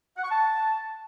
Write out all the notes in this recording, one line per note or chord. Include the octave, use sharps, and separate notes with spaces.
F#5
C#6
A5